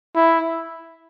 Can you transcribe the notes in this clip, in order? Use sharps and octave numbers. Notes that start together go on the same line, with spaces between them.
E4